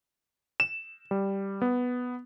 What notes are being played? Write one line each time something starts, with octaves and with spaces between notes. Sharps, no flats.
E7
G3
B3